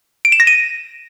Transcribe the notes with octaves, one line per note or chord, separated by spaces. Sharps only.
D7
E7
A#6
D#7